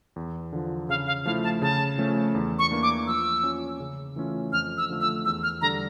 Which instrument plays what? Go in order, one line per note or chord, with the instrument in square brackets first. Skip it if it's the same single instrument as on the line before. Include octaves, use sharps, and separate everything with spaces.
[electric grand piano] E2
D3 F3
[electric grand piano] C#3 [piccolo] F5
[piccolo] F5
[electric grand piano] F3 A3 E4 [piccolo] F5
[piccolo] A5
[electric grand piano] C#3 [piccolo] A5
[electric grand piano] F3 A3 C#4
E2
[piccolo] C#6
[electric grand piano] E3 A#3 D4
[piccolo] D6
[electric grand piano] F3 [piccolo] E6
[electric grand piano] C#4 F4
C#3
E3 A3 C#4 F4
[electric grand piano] F2 [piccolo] F6
[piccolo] E6
[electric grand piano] D3 F3 A3
[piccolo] E6
[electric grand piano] E2 [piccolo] E6
[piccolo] F6
[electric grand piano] D3 G3 D4 A4 [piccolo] A#5